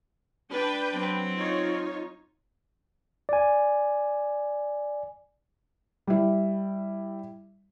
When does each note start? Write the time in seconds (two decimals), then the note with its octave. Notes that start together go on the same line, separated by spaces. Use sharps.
0.50 D4 B4 G5
0.92 F#3 C4
1.37 D#4 F4 C#5
3.29 D5 G#5
6.07 G3 E4